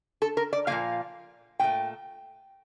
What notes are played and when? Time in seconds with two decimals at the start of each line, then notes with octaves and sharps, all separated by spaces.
0.22 A4
0.37 A#4
0.53 D5
0.67 A#2 F3 A#3 F5
1.59 A#2 A3 G5